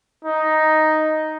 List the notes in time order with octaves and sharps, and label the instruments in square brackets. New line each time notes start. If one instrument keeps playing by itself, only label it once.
[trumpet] D#4